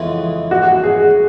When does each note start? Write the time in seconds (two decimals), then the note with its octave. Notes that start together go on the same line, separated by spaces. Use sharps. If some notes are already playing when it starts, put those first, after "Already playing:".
Already playing: F2 C#3 E3 G#3 B3 E4
0.51 F#4
0.83 G#4